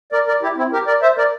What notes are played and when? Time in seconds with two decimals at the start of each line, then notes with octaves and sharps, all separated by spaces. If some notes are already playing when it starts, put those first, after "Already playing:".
0.12 A#4 D5
0.27 A#4 D5
0.43 E4 G4
0.57 C4 E4
0.73 G4 A#4
0.87 A#4 D5
1.02 C5 E5
1.18 A#4 D5